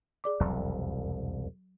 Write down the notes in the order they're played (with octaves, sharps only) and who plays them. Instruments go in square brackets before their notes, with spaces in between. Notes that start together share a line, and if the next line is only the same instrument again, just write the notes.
[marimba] G#4 D5 D6
[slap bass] E1 C2 F2 [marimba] F#3